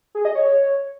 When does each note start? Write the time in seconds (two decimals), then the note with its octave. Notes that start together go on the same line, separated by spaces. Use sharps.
0.15 G#4
0.25 D#5
0.35 C#5